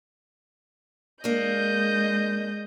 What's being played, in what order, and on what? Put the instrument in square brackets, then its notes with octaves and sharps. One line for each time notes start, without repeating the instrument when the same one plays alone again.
[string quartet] G#3 D#5 G6 [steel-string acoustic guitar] A#3 D4